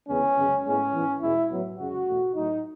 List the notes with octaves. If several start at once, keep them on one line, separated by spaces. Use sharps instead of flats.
E2 C#3 G#3 B3 C#4
F#2 C#3 G#3 B3
A2 G#3 B3 C#4
G#2 E3 B3
E2 B2 G#3 B3 E4
A2 F#3 B3
F#2 C#3 G#3 F#4
E2 B2 A3
A2 F#3 A3 D#4